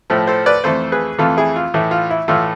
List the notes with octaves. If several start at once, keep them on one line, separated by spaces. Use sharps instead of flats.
A2 F3 A3
A4 C5
B4 D5
F2 E3 A3 A4 C5
G#4 B4
F2 E3 A3 F4 A4
E4 G#4
F4
A2 E3 A3 E4
F4
E4
A2 E3 A3 F4